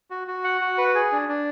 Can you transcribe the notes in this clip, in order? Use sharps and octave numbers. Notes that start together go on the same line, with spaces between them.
F#4
F#4
F#5
F#4
B4
G#4
D4
D4